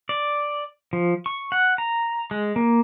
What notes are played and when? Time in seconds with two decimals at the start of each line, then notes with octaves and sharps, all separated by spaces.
0.09 D5
0.93 F3
1.26 C#6
1.52 F#5
1.78 A#5
2.31 G#3
2.56 A#3